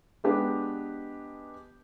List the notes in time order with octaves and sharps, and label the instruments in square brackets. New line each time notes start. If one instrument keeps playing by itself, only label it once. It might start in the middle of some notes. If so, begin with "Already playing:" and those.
[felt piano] G#3 B3 D4 G4 B4